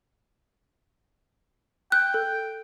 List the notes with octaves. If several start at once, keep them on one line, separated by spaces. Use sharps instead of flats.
G5 F#6
A4